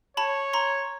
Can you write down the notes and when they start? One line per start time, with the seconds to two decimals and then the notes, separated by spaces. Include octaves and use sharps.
0.17 C#5 A5 B5
0.53 A#5 C6